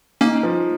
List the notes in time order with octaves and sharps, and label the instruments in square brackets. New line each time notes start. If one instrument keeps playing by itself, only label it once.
[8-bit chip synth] A#3 C#4 [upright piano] D#4
[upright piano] F3